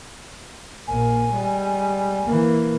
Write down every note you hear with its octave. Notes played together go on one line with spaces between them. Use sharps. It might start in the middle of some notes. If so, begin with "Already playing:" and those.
A#1 A#3 G#5
G3 G#3
E3 A#3